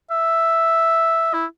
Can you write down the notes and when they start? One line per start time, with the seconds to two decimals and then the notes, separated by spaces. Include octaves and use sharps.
0.11 E5
1.34 E4